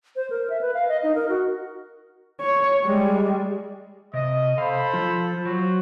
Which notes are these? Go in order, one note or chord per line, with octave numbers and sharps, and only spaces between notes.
C5
A#4
E5
B4
F5
D#5
D#4
A#4
F#4
C#5
G3 G#3
C3 D#5
A4 C5 F5 B5
F3 F4
F#3 F#4 C5